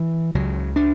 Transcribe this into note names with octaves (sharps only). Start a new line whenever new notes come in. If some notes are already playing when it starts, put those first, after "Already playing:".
Already playing: E3
C#2 C#3 F#3
D4